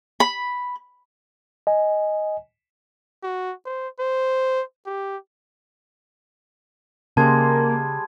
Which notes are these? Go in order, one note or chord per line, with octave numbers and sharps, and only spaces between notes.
B5
D#5 G#5
F#4
C5
C5
G4
C#3 G3 G#3 A#3 C5 A5 G#6